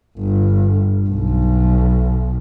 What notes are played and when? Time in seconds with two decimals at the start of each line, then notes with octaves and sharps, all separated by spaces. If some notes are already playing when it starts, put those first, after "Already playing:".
0.18 G1
1.09 B1